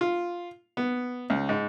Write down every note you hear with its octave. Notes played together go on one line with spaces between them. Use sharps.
F4
B3
C#2
G#2